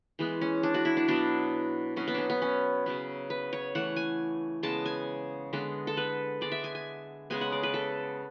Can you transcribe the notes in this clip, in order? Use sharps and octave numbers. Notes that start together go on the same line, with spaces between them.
E3 G#3 B3
C#4
D4
F#4
E4
D4
B2 F#3 B3 D4
B2 F#3 B3 C#4
B3
C#4 D4
B3
C#4
C#3 F#3 B3
B4
C#5
E3 A3 F#5
G#5
C#3 G#3 B3 A5
G#5
D3 G#3 B3
A4
B4
D3 G#3 B3 D5
E5
G#5
G#5
C#3 G#3 B3 G#5
F#5
D5
B4
A4